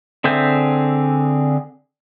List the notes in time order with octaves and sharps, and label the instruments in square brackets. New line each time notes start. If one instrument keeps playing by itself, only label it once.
[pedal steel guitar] D3 C4 G#4 E5 G6